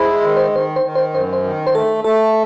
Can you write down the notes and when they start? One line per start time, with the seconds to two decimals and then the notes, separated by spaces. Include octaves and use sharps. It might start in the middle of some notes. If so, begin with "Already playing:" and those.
Already playing: G#3 E4 C5
0.22 D#3
0.37 C5
0.52 D#3 C5
0.76 C5
0.83 D#3
0.95 C5
1.13 F#2 C5
1.33 C5
1.43 D#3
1.67 C5
1.75 A3 A4
2.04 A3 A4